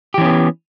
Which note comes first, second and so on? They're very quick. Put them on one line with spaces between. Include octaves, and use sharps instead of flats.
G4 E3 C#4 B3